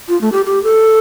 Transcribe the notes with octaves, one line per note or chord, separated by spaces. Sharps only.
F4
A3
G4
G4
A4